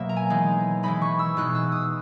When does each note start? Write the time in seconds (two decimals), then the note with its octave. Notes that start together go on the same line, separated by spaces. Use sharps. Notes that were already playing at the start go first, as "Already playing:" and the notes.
Already playing: B2 F#3 A#3 E5
0.09 A#5
0.16 G#5
0.30 E3 G#3 D#4
0.83 E3 G#3 D#4 B5
1.02 C#6
1.19 E6
1.37 B2 G#3 D#4 F#6
1.55 E6
1.72 D#6